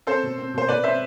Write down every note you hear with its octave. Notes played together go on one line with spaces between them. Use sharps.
C4 A4 C5
B2
C4
B2 C5
B2 B4 D5
C4 C5 E5